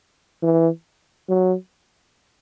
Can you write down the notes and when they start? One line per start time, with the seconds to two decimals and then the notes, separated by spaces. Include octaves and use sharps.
0.43 E3
1.28 F#3